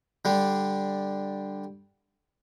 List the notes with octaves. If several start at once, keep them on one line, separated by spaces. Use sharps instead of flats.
D3 G3 D4